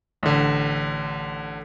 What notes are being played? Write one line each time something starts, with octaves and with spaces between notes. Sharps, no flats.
A1 D3